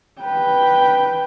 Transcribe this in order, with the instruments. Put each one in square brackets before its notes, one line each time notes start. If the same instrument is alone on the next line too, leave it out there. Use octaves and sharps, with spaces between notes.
[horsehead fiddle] B4 G5